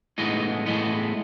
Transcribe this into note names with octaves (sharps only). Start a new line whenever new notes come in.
A2 E3 G#3 B3 D#4
A2 E3 G#3 B3